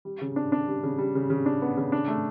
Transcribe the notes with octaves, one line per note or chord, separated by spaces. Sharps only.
G3
C#3
D4
D4
G3
C#3
G3
C#3
C#3
D4
B3
C#3
D4
A3